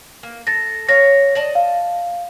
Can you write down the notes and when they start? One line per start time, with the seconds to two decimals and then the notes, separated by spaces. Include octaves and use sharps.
0.23 A#3
0.47 A4 A6 A#6
0.89 C#5 F5 A#6
1.35 D5 D#5 A5
1.55 F5